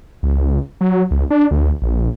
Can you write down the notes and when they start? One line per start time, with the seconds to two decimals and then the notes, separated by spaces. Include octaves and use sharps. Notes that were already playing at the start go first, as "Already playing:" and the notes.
0.23 C#2
0.81 F#3
1.11 C#2
1.30 D4
1.51 D2
1.82 A#1